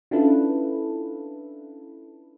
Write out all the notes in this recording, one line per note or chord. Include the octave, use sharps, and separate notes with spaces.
C#4 D4 E4 F4 A4 B4